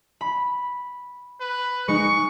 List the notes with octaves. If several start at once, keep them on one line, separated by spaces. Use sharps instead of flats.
B5
B4
G#3 D#4 C#6